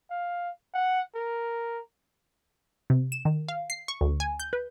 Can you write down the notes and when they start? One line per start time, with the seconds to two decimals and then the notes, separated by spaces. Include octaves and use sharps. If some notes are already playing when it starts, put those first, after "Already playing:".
0.10 F5
0.74 F#5
1.15 A#4
2.90 C3
3.12 E7
3.25 D#3
3.48 F5
3.70 C7
3.88 C#6
4.01 D2
4.20 G#5
4.40 G6
4.53 B4